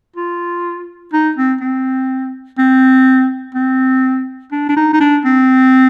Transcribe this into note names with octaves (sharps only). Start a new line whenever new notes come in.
F4
D#4
C4
C4
C4
C4
D4
D4
D#4
D#4
D4
C4